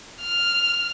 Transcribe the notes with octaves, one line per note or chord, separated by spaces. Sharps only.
F6